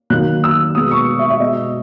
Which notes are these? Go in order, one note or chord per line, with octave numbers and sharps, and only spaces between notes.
D#3 F#3 A#3 F#6
E6
B2 G#3 B3 D#6
C#6
E5
E5
B2 G#3 B3 D#5